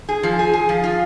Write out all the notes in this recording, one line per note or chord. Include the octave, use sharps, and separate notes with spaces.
G#4
F3
G#4
G#4
F3
F4